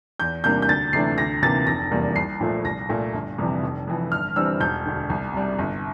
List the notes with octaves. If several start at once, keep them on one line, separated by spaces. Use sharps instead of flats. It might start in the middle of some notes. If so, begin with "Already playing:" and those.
E2 G6
C3 G3 A#3 D4 G6
G6
D2 A6
C3 E3 A3 D4 C7
D2 A#6
C3 E3 A#3 A6
F1 A#6
E2 C3 G3 A#3
C2 C7
A#2 F3 A3
C2 A#6
A#2 A3
G1
F2 C3 E3 G3
F1
F2 E3
G1 F6
G2 E3 G3 C4 E6
E1 G6
D2 D3
C2
C3 G3
G1